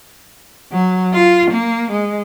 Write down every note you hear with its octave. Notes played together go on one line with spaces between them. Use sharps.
F#3
F4
A#3
G#3